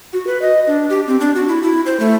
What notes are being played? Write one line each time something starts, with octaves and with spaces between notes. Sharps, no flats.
F#4
B4
D#5
D4
G4
C4
D4
F#4
E4
E4
C5
A3